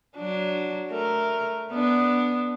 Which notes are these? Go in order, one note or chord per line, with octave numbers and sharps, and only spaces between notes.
F#3 D4
A3 A#4
B3 D4